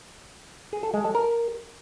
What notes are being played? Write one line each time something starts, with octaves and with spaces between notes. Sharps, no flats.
G#4
A4
G#3
A4
A#4